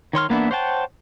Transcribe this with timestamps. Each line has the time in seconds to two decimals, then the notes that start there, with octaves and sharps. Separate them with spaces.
0.13 D#3 C#5 C6 F6
0.29 E3 A#3 B3 D4 E4
0.51 C5 C#5 F#5 G5 A5